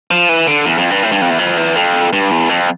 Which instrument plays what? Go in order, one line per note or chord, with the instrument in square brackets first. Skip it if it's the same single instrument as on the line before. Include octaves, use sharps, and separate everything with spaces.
[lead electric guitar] F3
E3
D3
E2
F2
G2
A2
G2
F2
E2
F2
E2
F2
G2
E2
F2